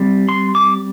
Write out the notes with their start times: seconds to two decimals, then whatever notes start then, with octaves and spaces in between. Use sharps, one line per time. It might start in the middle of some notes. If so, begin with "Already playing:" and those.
Already playing: G3 C4
0.29 C6
0.55 D6